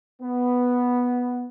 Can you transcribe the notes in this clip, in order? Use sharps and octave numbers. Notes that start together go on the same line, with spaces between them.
B3